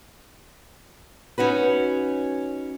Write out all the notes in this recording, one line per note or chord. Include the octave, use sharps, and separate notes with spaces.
C#4 D#4 F#4 B4